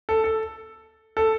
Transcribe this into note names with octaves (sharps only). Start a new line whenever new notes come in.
A4
A4
A4